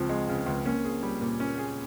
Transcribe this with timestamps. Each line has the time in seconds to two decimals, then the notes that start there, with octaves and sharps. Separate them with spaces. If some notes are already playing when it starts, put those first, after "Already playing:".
Already playing: C#2 C#3 F3 C4
0.09 G#3
0.29 C#3
0.46 C#2
0.66 A#3 C#4
0.85 G#4
1.03 G3
1.21 A#2
1.40 C#4
1.58 G#4